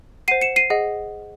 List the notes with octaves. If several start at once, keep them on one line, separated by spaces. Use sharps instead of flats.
C5 F#5 C7 D#7
C#7 E7
C7 D#7
G#4 D#5 F#5